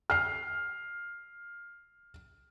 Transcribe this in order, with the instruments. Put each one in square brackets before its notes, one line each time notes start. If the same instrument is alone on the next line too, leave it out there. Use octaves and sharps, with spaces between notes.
[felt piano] F6 C7